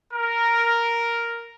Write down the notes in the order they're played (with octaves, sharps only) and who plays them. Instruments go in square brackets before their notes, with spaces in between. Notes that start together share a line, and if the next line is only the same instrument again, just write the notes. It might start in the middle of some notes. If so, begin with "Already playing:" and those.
[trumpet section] A#4